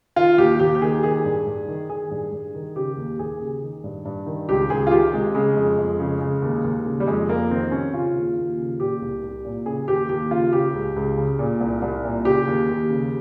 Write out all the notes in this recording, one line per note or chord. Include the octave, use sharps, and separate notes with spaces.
D#3 F4
D#2 G4
D#2 G4
G4
D#3 G#4
D#3 G#4
G2
G2
D#3
D#3 G#4
G2
G2
D#3
C#3 G4
D#2
D#2 G#4
C#3
D#3
G2
G2
D#3
C#2 G4
C#2 G#4
F4
D#3 G4
C3 G#3
C#3 G#3
F2
F2
C#3
C#3
D#2
D#2
C#3
G3
F2 G#3
F2 A#3
D#3 C4
C3 C#4
C#3 F4
D#2
D#2
C#3
A#2 G4
C2
C2
A#2
C#3 G#4
D#2 G4
D#2 G4
C#3 F4
C#3 G4
C#2
C#2
C#3
A#2
C2
C2
A#2
C#3 G4
D#2
D#2
C#3